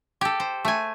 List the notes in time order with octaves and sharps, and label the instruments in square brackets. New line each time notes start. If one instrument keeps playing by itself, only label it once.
[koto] G4 A4
C5
A3 G#5